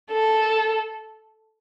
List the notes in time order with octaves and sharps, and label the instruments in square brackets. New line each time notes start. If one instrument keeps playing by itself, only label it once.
[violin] A4